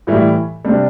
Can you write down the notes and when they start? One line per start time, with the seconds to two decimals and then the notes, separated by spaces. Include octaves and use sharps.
0.07 A2 E3 G3 E4
0.65 C3 G3 D4